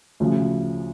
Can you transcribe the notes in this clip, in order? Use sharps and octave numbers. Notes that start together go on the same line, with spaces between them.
D2 C#3 F3